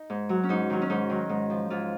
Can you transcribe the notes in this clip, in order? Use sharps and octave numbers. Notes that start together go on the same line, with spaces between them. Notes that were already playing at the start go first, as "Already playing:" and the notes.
Already playing: D#4
G#2
F#3
C#4
G#2 D#4
D#3 F#3
C#4
G#2 D#4
D#3 F#3
G#2
F3
G#2 F4